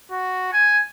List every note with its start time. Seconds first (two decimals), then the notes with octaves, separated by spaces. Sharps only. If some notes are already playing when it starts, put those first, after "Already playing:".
0.11 F#4
0.53 G#5